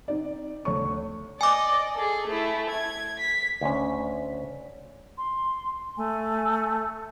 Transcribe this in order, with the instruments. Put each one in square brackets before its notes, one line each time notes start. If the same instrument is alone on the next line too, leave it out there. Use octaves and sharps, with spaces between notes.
[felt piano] C4 D#4 D5
D2 C#5 C#6
[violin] D5 D#5 [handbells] G#5 D6
[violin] G#4 A4
A3 E4
G#6
B6
[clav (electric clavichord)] D2 C#4
[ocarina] C6
[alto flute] A3 [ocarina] G#5